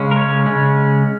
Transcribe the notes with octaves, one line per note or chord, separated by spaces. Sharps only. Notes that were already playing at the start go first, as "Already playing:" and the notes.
Already playing: C#3 G#3 C#4
A#4
C#5
C#3 G#3 C#4